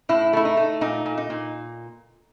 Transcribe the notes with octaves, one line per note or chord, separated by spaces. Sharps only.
A2 E4
A3 E4
D#4
A3
A#2 D#4
A#2
D#4
A#2